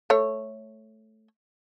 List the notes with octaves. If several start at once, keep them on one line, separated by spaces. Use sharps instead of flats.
A3 C#5